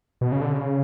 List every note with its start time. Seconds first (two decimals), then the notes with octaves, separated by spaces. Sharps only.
0.21 B2
0.32 C#3
0.41 D3
0.52 C#3